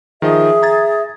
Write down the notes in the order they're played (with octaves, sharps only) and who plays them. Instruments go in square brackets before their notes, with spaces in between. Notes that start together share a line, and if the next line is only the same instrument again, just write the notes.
[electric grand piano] D#3 F3 D#5 [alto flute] G#4 [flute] E5
[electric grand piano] A#5 G#6 A6